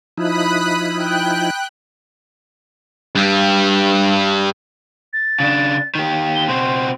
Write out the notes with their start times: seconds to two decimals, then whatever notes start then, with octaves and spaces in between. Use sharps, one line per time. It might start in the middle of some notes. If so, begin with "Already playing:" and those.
0.18 F3 D#4 E4 B5 D#6 F#6
0.97 G5 F#6
3.15 G2 G3
5.13 A6
5.40 C#3 D4
5.95 D#3 G4
6.36 G7
6.48 B2 C4 C6